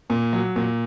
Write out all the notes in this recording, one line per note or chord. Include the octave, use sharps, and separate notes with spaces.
A#2
F#3
A#2